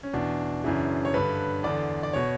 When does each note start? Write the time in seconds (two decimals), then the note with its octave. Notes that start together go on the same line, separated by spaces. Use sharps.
0.03 C#4
0.14 E2 B2 D4
0.64 F#2 C#3 E3
1.05 C#5
1.14 G2 D3 B4
1.63 E2 D3 D5
2.03 D5
2.13 B2 C#5